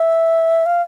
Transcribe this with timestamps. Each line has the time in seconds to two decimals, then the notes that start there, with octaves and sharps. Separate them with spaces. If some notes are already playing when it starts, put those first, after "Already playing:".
Already playing: E5
0.66 F5